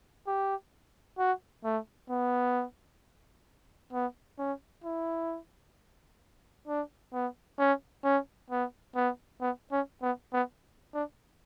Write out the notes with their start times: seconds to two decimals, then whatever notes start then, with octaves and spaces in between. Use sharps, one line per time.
0.27 G4
1.18 F#4
1.64 A3
2.10 B3
3.93 B3
4.38 C#4
4.84 E4
6.68 D4
7.13 B3
7.59 C#4
8.04 C#4
8.50 B3
8.95 B3
9.41 B3
9.72 C#4
10.02 B3
10.33 B3
10.94 D4